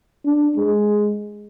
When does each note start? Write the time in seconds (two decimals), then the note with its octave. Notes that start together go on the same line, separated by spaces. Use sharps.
0.25 D4
0.57 G#3